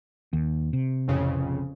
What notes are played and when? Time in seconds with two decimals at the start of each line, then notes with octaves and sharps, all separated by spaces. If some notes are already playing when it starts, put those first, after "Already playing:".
0.33 D#2
0.73 C3
1.08 A1 F2 C#3